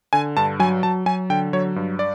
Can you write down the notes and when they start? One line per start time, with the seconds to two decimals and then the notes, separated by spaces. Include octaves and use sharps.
0.13 D3 G#5
0.37 G2 A5
0.59 F#3 G#5
0.83 F#3 A5
1.06 F#3 G#5
1.30 D3 G5
1.53 F#3 C#5
1.76 G2
1.99 D5